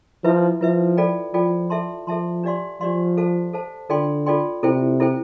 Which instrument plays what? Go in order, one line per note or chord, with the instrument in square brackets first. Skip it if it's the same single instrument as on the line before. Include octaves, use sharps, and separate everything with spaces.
[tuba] F3 [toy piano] E4 B4 E5
[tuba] F3 [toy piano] E4 B4 E5
[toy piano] F4 A4 D5 G5
[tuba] F3 [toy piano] F4 A4 D5 G5
[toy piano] A4 E5 A5 C6
[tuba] F3 [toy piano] A4 E5 A5 C6
[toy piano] D4 G4 D5 F5 C6
[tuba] F3 [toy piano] D4 G4 D5 F5 C6
[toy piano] A4 C5 F5 A5
A4 C5 F5 A5
[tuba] D3 [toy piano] F4 A4 D5 G5 C6
[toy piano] F4 A4 D5 G5 C6
[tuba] C3 [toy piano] E4 A4 C5 G5
[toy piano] E4 A4 C5 G5